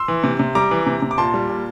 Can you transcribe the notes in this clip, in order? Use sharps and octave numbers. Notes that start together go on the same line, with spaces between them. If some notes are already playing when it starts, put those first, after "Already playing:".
Already playing: C6 E6
E3
C3
C3
G3 A#5 D6
E3
C3
C3
D6
A#2 A5 C6
G3
A#2